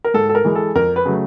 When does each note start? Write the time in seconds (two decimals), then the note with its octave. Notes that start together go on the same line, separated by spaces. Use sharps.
0.04 A#4
0.14 G#2 A4
0.29 A4
0.35 A#4
0.45 E3 G#3
0.55 A4
0.75 F2 A#4
0.96 B4
1.05 C#3 F#3 A3